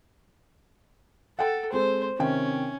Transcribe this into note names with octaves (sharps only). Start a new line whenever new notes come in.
A4 F#5 G5
G#3 C4 A4 C5
C3 D#3 C#4 G5